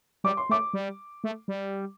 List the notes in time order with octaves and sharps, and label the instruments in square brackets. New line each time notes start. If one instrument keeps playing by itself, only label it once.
[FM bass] G3 [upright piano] D6
[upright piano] C6
[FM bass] A3 [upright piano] D6
[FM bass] G3
A3
G3